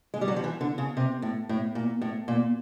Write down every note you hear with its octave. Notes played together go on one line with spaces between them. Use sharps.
G#3
G3
F#3
F3
E3
D3
C#3
C3
A2
A2
A#2
A2
A#2